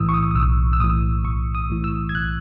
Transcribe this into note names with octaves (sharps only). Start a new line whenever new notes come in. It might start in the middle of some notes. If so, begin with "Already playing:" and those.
Already playing: B1 A2 E3 D#6 E6
C#6
D#6
D#6
B1 E6
E6
A2 E3 D#6
B1 C#6
D#6
A2 E3
E6
G#6
B1 F#6